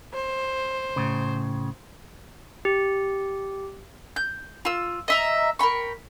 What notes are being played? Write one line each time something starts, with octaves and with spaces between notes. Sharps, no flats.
C5
A2 C#3
G4
G6
F4 E6
D#5 E5 A#5
A#4 G5 B5 C#6